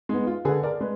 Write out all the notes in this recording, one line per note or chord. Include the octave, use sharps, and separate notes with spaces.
G#3 B3 D#4
F4
D3 G#4 B4
A#4 D5
G#3 B4